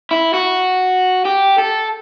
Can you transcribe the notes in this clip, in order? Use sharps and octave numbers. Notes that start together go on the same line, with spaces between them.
E4
F#4
G4
A4